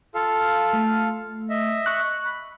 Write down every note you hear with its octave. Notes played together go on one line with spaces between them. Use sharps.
F4 A4 F5
A3
D#5 E5
C#6 F#6
B5